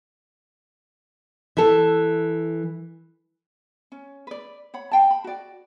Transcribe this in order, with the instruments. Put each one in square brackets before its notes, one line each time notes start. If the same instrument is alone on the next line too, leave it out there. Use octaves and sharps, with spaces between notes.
[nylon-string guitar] E3 A4
[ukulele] C#4
B4 D5
C#5 F#5 B5
F5 G5 A5
B5
F#4 D5